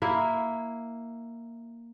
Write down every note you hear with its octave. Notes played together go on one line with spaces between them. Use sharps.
A#3 E4